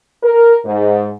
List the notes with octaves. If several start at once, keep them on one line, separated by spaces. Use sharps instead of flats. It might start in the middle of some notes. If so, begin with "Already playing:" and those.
A#4
G#2